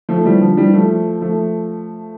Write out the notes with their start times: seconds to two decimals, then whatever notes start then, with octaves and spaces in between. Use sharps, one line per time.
0.09 F3 A3
0.25 E3 G3
0.41 D3 F3
0.57 E3 G3
0.73 F3 A3
1.22 F3 A3